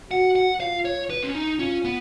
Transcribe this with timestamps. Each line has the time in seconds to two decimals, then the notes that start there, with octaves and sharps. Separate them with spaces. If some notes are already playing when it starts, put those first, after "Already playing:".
0.11 F#4 F#5
0.36 F#5
0.60 F4 F5
0.85 C#5
1.10 B4
1.23 C#4
1.35 D#4
1.59 C#4 F4
1.84 B3